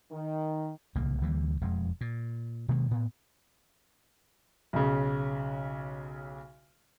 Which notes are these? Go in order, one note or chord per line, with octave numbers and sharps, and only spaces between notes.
D#3
D1 C2 C#3 A#3
D2 E3 G3 A#3
E1 F2 G#3
A#2
B2 D#3 G#3 A#3
A2 B3
B1 C#3